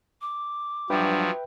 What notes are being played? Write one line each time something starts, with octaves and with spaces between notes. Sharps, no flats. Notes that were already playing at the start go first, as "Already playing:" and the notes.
D6
G2 F3 F#3 B4 E5 G5